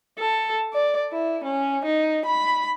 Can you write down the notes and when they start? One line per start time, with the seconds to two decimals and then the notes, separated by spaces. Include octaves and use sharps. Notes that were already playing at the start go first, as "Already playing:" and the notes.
0.19 A4
0.74 D5
1.12 E4
1.44 C#4
1.85 D#4
2.26 B5